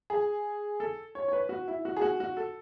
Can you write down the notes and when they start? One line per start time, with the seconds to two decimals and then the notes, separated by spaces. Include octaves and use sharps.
0.10 G#4
0.80 A4
1.15 C#5
1.28 C#5
1.33 B4
1.49 F#4
1.68 E4
1.85 F#4
1.97 G#4
2.02 F#4
2.20 F#4
2.37 A4